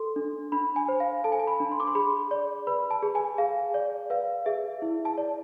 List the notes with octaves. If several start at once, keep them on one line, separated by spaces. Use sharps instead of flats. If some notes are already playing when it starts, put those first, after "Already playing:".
Already playing: A4 C6
D4
D4 B5
G#5
C5
F5
A4 A5
G#5
A5
B5
D4
C6
D6
C6
G#4 B5
D5
B4 B5
A5
G#4
G#5
G#4 F5
D5
B4 F5
G#4 E5
E4
A5
D5